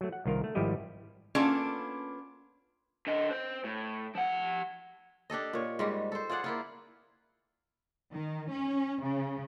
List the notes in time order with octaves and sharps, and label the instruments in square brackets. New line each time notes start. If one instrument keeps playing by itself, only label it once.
[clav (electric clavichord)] F#3 A3
F#5
C2 D#3 F4 A#4
A3
G#1 F3 G3 E4 G4 D#5
[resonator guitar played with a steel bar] A#3 B3 C#4 D4 F4 A4
[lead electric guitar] D3 D#5
C4 C5
A2
F3 F#5
[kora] D4 G4 A4 D#5
A#2 C#5
G#2 G3 G#3
A4 C5
F4 G#4 D5 F#5
A#3 E4 F4
[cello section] D#3
C#4
C#3